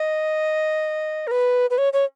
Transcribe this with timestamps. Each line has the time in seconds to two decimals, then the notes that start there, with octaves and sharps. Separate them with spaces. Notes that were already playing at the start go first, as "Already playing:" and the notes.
Already playing: D#5
1.27 A#4
1.31 B4
1.70 B4
1.78 C#5
1.93 C#5